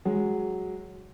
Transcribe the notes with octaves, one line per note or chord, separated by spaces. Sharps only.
F#3 G#3